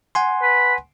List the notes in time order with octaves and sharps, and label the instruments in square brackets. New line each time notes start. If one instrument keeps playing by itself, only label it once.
[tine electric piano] F#5 G#5 C6
[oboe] B4